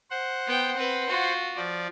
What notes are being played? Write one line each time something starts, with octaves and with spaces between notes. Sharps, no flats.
C5 F#5
B3 G5
C4 B4
F4 F#4
F3 D5